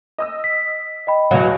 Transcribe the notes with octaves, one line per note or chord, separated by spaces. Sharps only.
D#5 D#6 E6
B6
D#5 G5 B5
E2 B2 F#3 F5